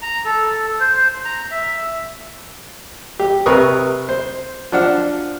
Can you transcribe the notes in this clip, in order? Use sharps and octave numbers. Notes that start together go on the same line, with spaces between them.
A#5
A4
C5
A#5
E5
G4
C3 A#4 B4 C#6 D#6
C5
F3 D4 F#5 F6